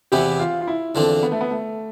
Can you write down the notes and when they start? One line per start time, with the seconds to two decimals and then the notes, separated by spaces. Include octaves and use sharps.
0.12 E2 C3 E3 B3 G4
0.40 F4
0.61 F4
0.67 E4
0.95 E2 D3 F3 C4 D4
1.23 B3
1.32 A3
1.41 B3
1.51 A3